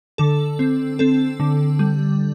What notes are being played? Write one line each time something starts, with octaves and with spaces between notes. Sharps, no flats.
D3 A4
C4
C4 A4
D3
G3